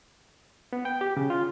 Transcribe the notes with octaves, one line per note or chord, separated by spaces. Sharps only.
B3
G5
G4
C#3
F4